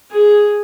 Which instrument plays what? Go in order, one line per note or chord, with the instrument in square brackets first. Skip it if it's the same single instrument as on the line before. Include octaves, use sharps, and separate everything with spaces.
[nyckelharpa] G#4